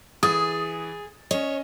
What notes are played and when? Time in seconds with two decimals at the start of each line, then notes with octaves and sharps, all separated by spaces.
0.23 E3 G#4 D#6 A6
1.31 C#4 C#5 D#5